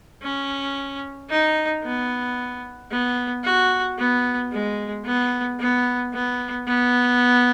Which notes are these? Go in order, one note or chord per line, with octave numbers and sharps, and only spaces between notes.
C#4
D#4
B3
B3
F#4
B3
G#3
B3
B3
B3
B3